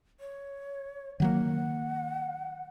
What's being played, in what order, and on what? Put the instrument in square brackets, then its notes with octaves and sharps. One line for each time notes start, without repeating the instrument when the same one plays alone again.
[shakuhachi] C#5
[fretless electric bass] D#3 F#3 A#3 [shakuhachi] F#5